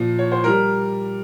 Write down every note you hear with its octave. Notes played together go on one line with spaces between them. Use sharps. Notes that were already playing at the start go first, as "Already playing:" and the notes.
Already playing: A#2 F3
C#5
C5
G3 A#4